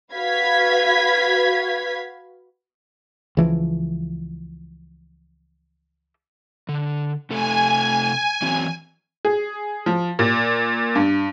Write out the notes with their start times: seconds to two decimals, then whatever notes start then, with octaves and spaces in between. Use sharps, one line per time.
0.13 F#4 B4 F5 G#6 B6
3.37 C#2 E3 F3
6.69 D3
7.30 C3 A3 A4 G#5
8.42 E3 F#3 C4
9.25 G#4
9.86 F3
10.19 A#2
10.95 G2